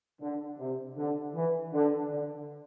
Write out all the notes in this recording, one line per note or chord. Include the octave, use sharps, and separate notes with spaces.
D3
C3
D3
E3
D3
D3